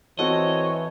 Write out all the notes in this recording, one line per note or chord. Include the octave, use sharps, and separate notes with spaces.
E3 C4 F#4 A4 C#5 D#5